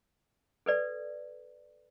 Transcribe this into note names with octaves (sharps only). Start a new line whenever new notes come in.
A4 B4 D5